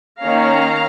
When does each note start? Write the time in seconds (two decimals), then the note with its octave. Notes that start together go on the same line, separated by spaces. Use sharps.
0.21 D#3 A#3 C#4 F5 A#5